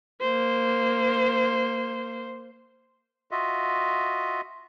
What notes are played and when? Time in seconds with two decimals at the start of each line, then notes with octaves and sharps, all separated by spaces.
0.21 A#3 C5
3.31 F4 F#4 D#5 E5